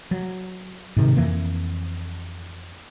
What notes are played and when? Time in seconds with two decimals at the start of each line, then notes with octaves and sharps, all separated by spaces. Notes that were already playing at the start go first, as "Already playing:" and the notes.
0.11 F#3
0.96 G#2 C3 D#3
1.17 F2 E3 A#3